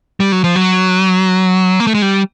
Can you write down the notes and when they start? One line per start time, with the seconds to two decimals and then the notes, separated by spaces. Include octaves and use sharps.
0.20 G3
0.32 F#3
0.44 F3
0.56 F#3
1.80 A#3
1.87 A3
1.95 G#3
2.02 G3